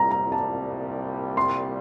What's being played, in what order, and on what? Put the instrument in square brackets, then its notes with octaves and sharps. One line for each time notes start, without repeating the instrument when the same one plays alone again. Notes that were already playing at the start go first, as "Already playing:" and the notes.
Already playing: [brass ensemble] C2 A#2 G3 [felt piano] A#5
[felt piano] A#5
A5
C6